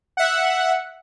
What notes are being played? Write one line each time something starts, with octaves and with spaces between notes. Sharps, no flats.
E5 F#5